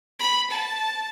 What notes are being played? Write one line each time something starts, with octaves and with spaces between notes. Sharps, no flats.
B5
A5